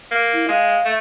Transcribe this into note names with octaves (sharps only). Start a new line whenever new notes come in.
A#3
E4
G#3 F5
A3